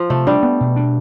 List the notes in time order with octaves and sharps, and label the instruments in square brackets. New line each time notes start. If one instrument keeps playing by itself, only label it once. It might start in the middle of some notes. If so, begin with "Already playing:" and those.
Already playing: [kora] F3
[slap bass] C3 [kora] A3
[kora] G3 [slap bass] D4
[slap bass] B3
B2
D4